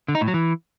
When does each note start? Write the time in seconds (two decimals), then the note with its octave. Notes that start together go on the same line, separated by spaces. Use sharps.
0.08 D3
0.15 D#4
0.21 A2
0.28 F#3
0.34 E3